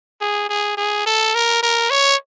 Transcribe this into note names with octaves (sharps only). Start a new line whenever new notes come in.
G#4
G#4
G#4
A4
A#4
A#4
C#5